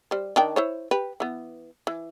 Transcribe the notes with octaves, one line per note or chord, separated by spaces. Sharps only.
G3 C5
D#3 D4 G5
E4 C5 C#5
G4 B4
E3 B3
E3